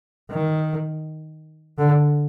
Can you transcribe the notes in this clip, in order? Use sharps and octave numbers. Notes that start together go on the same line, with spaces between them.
D#3
D3